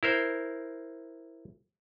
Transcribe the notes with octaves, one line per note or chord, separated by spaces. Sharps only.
E4 A#4 C5